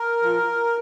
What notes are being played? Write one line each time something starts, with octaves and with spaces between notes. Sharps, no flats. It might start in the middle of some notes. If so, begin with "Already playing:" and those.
Already playing: A#4
F3